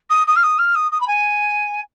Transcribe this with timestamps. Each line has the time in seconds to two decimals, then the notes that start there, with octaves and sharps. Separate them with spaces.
0.09 D#6
0.27 D#6
0.35 F6
0.43 D#6
0.58 F6
0.75 D#6
0.91 D#6
1.00 B5
1.07 G#5